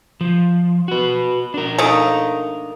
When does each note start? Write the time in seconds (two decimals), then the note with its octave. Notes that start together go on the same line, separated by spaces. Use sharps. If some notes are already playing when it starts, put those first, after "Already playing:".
0.21 F3
0.88 F#4 B4
1.54 D4 A#4
1.78 A3 A#3 D#4